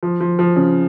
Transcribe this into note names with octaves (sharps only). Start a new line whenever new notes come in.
F3
F3
F3
C#3